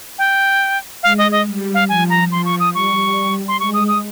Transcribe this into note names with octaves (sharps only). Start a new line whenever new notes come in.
G5
G#3 F5
D#5
D#5
G3
F5
F3 G#5
A#5
F3 C6
C#6
D#6
G3 C#6
C6
G#3 C#6
D#6
D#6